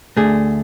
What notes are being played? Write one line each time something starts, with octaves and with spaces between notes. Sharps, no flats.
D2 D3 A3 G#4